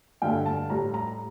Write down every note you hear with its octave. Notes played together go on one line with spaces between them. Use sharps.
G2 D3 A3 G5
A5
A2 G3 A#5
A#5